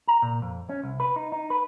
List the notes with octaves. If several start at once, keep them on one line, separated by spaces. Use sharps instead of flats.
A#5
A#2
F2
C#4
C2
B4
D#4
D#4
B4